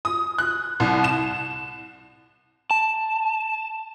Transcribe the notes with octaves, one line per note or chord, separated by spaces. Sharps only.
D#6
F#6
C2
E7
A5